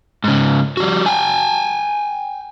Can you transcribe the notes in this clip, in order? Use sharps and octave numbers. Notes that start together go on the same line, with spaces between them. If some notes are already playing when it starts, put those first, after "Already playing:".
G#2 C#3
G3 F#4
G5 G#5